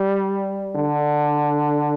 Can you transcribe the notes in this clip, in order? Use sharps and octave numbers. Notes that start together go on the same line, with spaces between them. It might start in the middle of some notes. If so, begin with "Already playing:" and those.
Already playing: G3
D3